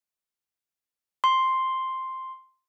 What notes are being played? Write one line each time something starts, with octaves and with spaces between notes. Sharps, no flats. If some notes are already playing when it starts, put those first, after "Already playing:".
C6